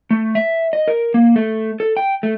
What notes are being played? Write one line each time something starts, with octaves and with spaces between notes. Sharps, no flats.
A3
E5
D#5
A#4
A#3
A3
A4
G5
A3